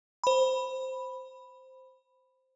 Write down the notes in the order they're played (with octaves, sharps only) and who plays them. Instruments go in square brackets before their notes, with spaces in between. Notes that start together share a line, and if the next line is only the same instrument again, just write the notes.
[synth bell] C5 B5